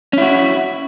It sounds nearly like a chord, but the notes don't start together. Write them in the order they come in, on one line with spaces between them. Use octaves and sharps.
C#4 E4 F#4